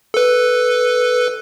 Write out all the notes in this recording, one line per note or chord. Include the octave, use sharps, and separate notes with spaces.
A4 B4